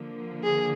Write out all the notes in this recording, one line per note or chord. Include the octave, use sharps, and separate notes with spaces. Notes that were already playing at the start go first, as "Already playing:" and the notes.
Already playing: D3 F3 A#3
G#4